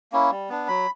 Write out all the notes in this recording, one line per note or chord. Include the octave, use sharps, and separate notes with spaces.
A#3 C#4 E4
G3
B3 D4
F#3 B5